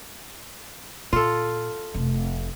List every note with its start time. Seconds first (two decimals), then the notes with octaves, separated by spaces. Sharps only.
1.13 A#2 F4 A4
1.94 F1 C3